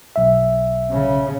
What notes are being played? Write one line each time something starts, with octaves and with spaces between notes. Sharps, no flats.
B1 E5
C#3